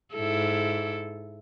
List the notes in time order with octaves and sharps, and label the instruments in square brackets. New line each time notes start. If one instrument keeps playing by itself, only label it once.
[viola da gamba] G#2 E4 A4